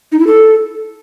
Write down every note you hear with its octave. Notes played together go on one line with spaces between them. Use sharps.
D#4
E4
A4